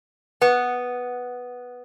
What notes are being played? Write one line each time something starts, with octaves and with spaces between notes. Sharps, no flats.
B3